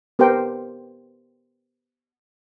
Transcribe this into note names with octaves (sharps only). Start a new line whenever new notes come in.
B3 G4 A#4 C5 G5